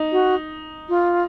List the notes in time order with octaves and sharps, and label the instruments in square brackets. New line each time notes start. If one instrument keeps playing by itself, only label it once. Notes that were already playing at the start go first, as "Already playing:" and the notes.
Already playing: [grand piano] D#4
[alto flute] F#4
F4